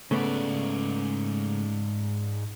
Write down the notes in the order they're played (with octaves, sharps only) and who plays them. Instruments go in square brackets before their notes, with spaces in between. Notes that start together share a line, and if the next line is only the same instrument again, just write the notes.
[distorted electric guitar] G#2 D5 [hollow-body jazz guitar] C#3 A3 B3